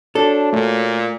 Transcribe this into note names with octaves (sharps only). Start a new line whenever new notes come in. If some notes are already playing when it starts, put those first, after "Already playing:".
D4 F#4 A4 C#5
A#2 A3